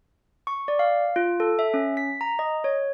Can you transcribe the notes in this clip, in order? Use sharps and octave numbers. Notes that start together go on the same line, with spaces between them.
C#6
D5
F5
F4
A4
E5
C#4
B6
A#5
D#5
C#5